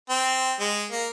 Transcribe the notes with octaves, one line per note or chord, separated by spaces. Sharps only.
C4
G#3
A#3